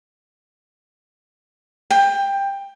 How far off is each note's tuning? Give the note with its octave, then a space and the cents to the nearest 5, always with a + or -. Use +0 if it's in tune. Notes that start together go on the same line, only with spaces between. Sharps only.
G5 +15